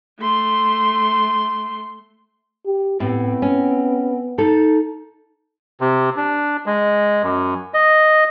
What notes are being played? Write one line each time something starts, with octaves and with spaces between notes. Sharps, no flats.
A3 C6
G4
A2 B3 C4
C#4
D#4 A4
C3
D4
G#3
F#2
D#5